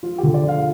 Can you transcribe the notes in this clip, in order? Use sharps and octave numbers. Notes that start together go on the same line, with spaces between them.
F3 F4
G4
D3
D5
F3 F5